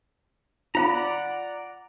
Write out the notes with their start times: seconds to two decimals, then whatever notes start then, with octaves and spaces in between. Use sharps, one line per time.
0.75 F4 D5 F5 F#5 A#5 B5